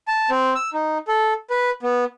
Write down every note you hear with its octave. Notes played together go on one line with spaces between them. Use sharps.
A5
C4
E6
D#4
A4
B4
B3